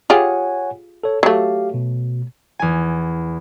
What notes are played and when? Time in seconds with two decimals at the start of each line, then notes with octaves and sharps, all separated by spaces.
0.10 F4 G4 G#4 C#5 F#5 G#5
1.03 A4 C#5
1.23 F#3 A3 G4 F5
1.74 B2
2.59 E2 G#5